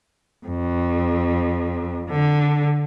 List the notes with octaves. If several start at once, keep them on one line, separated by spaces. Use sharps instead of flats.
F2
D3